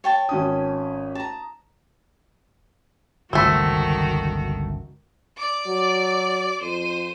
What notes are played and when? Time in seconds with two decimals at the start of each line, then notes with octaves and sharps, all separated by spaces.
0.04 C#5 G5 A5
0.29 G#1 C#4 D#6
1.15 A5 A#5
3.33 G1 C#2 D#3 A3 C4 F#4
5.37 D5 D6
5.67 F#3
6.61 F2 C5 D#7